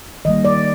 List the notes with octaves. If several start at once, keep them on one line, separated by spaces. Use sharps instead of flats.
D#3 G3 A#3 D#5
D5